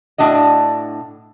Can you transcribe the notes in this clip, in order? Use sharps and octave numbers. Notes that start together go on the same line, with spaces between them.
A2 D4 F#4 D#5